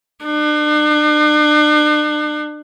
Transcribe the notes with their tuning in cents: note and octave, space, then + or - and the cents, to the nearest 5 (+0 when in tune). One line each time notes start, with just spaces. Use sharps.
D4 +40